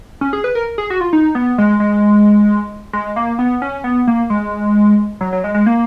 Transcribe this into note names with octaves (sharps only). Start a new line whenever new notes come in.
C#4
G#4
B4
A#4
G#4
F#4
F4
D#4
B3
G#3
G#3
G#3
A#3
B3
C#4
B3
A#3
G#3
F#3
F#3
G#3
G#3
A#3